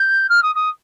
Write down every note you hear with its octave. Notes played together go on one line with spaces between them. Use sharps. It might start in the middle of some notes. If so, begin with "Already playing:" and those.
Already playing: G6
F6
D#6
D#6